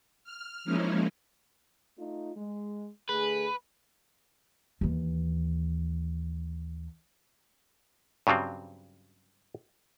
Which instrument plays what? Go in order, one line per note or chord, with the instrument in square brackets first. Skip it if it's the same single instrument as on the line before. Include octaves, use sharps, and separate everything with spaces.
[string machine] F6
F3 G#3 A#3 C#4 D#4 E4
[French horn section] A3 D#4 F4
G#3
[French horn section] D3 A3 G#4 [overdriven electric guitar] B4
[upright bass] D#2 E3
[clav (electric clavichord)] G2 C#3 F#3 G3 C4